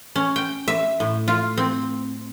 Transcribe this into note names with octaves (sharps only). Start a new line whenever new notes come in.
C#4
G5
E5
A2
F4
C4